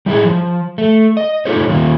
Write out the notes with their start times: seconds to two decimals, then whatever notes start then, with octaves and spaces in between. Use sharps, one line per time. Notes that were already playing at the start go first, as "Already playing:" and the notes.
0.06 G3 E4 G4 G#4
0.25 F3
0.78 A3
1.17 D#5
1.45 D#4 F4 G4 A4 C5 C#5
1.69 D#3 G3 A#3 F4